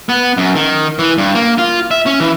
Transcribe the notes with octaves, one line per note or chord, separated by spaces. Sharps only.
B3
F#2
D#3
E3
G2
A#3
F4
E5
C#4
E3